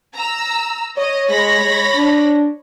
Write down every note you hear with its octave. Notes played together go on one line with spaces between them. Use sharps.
A#5 E6
C#5 D#5
G#3 C#5 B5 A#6
G#3
D4